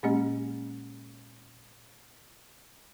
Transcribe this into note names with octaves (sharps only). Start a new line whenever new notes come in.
A#2 G#3 A#3 C#4 G4 D#5